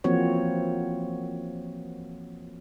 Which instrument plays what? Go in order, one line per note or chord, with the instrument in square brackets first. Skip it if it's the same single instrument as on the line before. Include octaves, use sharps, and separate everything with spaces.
[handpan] E3 F3 A#3 C4 F#4 C#5